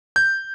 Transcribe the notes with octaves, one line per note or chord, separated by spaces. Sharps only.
G6